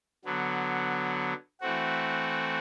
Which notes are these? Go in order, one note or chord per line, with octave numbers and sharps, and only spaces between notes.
D3 F#3 B3
E3 A3 C4 F#4